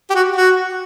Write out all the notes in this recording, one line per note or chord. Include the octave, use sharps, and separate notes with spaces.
G4
F#4
F#4